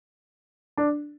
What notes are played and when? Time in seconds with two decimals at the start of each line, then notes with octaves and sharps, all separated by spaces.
0.77 D4